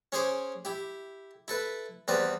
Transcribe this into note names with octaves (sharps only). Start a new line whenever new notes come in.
C#4 G#4 C5 D6
E4 G4
E4 A4 B4
E2 G3 C4 B4 D5